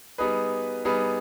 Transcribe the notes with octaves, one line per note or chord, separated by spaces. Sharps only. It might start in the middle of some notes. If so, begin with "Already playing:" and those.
G3 B3 D#4 G#4 B4
G3 B3 D#4 G#4 B4